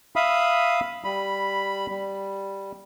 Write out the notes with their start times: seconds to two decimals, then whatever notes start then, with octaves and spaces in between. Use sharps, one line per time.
0.16 E5 F5 B5 D#6
1.04 G3 B5
1.89 G3